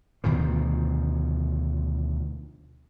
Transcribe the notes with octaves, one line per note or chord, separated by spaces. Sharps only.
D2 B2 D#3 F3